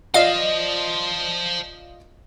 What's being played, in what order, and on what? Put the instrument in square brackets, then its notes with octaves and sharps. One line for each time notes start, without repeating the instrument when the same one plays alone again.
[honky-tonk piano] F4 D5 D#5 [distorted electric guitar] C5 A5 [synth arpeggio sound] F5